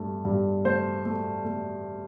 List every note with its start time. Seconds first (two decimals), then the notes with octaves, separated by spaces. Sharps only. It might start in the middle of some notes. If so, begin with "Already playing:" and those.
Already playing: G2 A3
0.25 G2
0.64 A3 C5
1.05 A3
1.45 A3